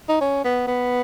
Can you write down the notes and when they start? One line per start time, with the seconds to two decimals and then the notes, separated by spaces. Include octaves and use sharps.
0.09 D#4
0.21 C#4
0.44 B3
0.68 B3